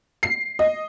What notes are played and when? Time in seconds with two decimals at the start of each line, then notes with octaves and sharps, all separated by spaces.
0.23 C7
0.59 D#5